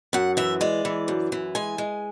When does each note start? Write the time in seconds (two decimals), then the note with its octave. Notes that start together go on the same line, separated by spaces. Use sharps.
0.13 F#2 F#5
0.37 E3 E5
0.61 G#3 D5
0.85 E3
1.08 F#2
1.32 E3
1.55 G#3 G#5
1.78 G#3